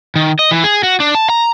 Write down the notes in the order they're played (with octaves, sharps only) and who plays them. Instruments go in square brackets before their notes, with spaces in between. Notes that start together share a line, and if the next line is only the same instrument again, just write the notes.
[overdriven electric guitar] D#3
D#5
E3
G#4
F#4
D4
A5
A#5